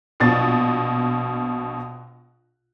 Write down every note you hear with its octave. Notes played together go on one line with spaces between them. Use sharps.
A#1 B2 A6